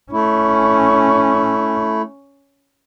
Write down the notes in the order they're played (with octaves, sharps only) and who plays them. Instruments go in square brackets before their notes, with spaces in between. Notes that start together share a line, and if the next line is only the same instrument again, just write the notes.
[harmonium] A3 E4 [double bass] C#4